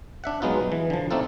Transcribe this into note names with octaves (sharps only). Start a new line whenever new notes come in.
D4 E5 F#5
F#3 G#3 B3 D#4 F4
E3
D3 F3
A3 C4 D4 D#4 F4 A4